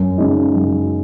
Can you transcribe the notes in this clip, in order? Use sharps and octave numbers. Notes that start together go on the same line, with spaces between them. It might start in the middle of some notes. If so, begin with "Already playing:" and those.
Already playing: F#2
C#3 G#3 D#4
F#2